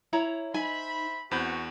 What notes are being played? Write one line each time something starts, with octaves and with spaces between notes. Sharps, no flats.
E4 C#5 A#5
D#4 C5 E5 G#5 B5
E2 C4 F#4 B5 G6